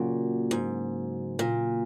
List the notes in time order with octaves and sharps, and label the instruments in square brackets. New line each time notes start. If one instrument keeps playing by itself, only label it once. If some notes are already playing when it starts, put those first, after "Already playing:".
Already playing: [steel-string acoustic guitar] A#2 [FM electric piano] C#3 F#3 A#3 F#4
[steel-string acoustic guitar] G#2
A#2